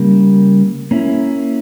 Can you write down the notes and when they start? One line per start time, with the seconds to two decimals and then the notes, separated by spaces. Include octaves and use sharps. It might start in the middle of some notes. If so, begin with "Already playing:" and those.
Already playing: C#3 G3 A#3
0.91 A#3 C#4 E4